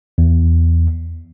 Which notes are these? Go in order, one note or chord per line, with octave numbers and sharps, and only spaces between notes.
E2